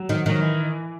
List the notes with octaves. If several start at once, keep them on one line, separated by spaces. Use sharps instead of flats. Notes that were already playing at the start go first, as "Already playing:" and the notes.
Already playing: F#3
D#3
D#3 F#3
E3